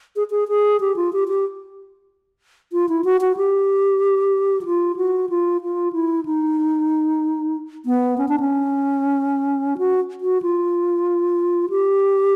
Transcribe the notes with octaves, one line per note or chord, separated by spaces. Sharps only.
G#4
G#4
G#4
G4
F4
G4
G4
F4
E4
F#4
F#4
G4
F#4
F4
F#4
F4
F4
E4
D#4
B3
C#4
D4
C#4
F#4
F#4
F4
G4